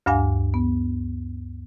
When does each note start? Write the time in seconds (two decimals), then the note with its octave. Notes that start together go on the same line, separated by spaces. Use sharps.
0.06 D2 G2 D4 F5 G#5
0.54 B3